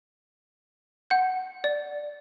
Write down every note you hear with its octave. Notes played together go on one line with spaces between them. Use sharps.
F#5 G6
D5